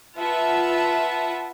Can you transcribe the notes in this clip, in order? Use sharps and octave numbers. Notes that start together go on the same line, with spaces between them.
F4 B4 E5 F#5 A5